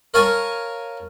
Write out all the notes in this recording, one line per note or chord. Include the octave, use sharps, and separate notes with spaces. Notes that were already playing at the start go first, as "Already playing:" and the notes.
A#4 C#5 F5 G#5 A5